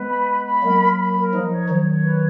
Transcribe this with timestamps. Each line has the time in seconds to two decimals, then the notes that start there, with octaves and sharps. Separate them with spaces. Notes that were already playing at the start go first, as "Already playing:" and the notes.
Already playing: G#3 B3 B4
0.10 B5
0.28 B5
0.45 B5
0.62 F#3 A#3 A#4
0.80 A#4
0.98 B5
1.16 A#4
1.33 F3 D#4
1.51 C#5
1.69 D#3 F#3 C#5
1.87 C#5
2.05 B4